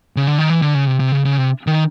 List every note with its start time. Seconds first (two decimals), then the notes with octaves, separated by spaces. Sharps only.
0.17 C#3
0.27 D3
0.38 D#3
0.50 E3
0.62 D3
0.75 C#3
0.87 C3
1.00 C3
1.12 C#3
1.25 C#3
1.38 C3
1.67 D#3